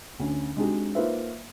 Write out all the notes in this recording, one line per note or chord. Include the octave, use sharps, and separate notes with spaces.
D2 C#4
G#3 C4 D4 D#4 F#4 G4
A#3 D#4 F4 B4 C5 E5